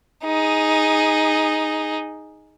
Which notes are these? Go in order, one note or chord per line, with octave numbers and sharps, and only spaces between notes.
D#4 G#4